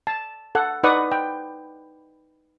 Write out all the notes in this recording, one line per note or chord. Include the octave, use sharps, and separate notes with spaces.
A5
A4 F#5
D#4 B4 D5 F#5 C#6 D#6
G5